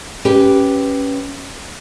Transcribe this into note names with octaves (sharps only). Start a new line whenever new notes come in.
C#4 G4 B4